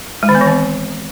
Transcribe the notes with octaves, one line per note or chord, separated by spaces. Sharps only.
G#3
D#3
B3
E3
C4